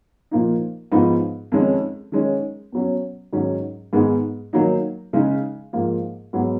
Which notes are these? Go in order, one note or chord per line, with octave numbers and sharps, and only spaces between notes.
A#2 F3 A#3 D#4
G#2 F3 B3 D#4
F2 D#3 G#3 C#4
D#3 G#3 C#4
B2 F#3 C#4
G#2 D#3 F#3 C#4
G#2 D#3 G#3 B3
D#3 F#3 A#3 D#4
C#3 G#3 D#4
G#2 F3 A#3
G#2 F#3 B3